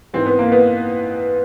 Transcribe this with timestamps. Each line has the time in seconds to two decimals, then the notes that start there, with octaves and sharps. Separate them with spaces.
0.14 G#2 E3 C4
0.26 B3
0.39 A#3
0.52 B3